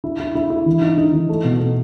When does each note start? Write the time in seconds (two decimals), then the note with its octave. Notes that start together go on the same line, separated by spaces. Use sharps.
0.04 E4
0.20 E4
0.35 E4
0.50 E4
0.66 E3
0.82 D#4
0.97 D#4
1.13 E3
1.29 A3
1.45 B2
1.60 A3